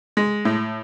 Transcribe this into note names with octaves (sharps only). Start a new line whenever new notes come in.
G#3
A2